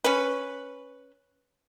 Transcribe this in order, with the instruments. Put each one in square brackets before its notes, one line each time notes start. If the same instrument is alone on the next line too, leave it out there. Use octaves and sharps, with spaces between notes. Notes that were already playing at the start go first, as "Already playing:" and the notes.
[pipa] C#4 B4